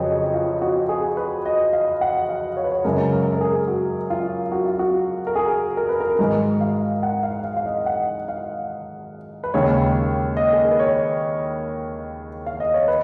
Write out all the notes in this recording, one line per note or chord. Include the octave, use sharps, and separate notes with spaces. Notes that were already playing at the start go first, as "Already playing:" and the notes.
Already playing: F2 C#3 F#3 G#4 B4 C#5 D#5
F4
F#4
G#4
B4
D#5
F5
F#5
F5
C#5
B4
C#5
F#2 C#3 G#3 A#4
A#4
A#4
G#4
F#4
F4
F#4
F4
F#4
A#4
G#4
A#4
B4
A#4
G#2 D#3 G#3
F5
F#5
F5
F5
F5
D#5
F#5
F5
B4
D#2 C#3 G#3 C#5
D#5
G#4
A#4
B4
C#5
F5
D#5
C#5
B4